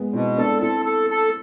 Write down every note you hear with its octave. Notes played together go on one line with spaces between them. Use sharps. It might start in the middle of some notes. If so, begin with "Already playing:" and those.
Already playing: G#3 B3
B2 C4 E4
B3 D4 A4
C4 E4 A4
A4
A4